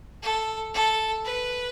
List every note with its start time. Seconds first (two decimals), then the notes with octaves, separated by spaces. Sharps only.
0.22 A4
0.74 A4
1.24 B4